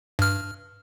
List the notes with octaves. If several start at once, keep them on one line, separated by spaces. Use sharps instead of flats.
G2 F6